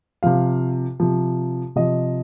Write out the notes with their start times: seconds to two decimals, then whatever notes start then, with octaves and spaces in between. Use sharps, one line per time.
0.23 C3 F3 F5
1.00 C3 F3
1.76 C3 F3 D#5